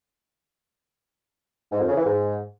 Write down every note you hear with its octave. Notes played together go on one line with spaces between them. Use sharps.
G#2
F2
C#3
E3
G#2